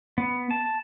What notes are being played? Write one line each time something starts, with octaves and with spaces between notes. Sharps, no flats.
B3
A5